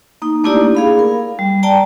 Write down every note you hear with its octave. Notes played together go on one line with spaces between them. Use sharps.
A#3 D#4
A3 A#3 D4 E4 G4 D5
G#4 F5 B5
A#4
G3
D5 G5 A5 A#5